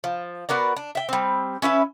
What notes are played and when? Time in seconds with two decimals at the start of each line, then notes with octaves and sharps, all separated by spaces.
0.04 F3
0.49 B3 F#4 A#4 D5
0.76 D4
0.95 E5 G5
1.09 G3 C4
1.62 C#4 E4 B4 E5